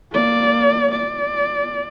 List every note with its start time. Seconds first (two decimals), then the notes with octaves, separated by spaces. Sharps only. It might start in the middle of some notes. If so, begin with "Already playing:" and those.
0.12 A#3 D5
0.92 D5